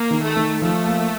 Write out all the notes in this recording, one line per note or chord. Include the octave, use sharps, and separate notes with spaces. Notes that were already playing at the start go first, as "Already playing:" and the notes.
Already playing: A#3
D#3
A3
D#3
F3 A3
A#3